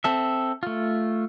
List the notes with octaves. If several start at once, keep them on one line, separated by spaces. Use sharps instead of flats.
C4 A4 E5
A3 F4